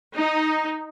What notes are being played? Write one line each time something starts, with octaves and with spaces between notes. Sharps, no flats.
D#4